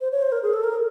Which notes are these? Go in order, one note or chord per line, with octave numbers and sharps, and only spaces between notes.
C5
C#5
C5
A#4
G#4
A4
A#4